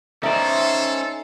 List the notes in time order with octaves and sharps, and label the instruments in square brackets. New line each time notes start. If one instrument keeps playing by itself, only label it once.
[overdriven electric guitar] C#4 C5 [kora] D#4 D5 [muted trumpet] A4 [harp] E5 A#5